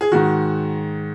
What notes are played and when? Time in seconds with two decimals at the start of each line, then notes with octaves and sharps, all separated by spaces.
0.01 G#4
0.12 G#2 D#3 F#4